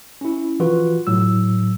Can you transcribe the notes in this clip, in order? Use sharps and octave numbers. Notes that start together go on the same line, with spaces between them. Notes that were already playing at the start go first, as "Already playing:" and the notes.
C#4 E4
E3 F3 F4 F#4 B4
A2 F#3 E6